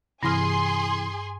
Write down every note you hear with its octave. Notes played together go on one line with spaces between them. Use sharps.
G2 C3 E3 G#4 G#5 C6 F6